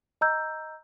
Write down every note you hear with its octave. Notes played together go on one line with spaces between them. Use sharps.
D#5 A#5 E6 G6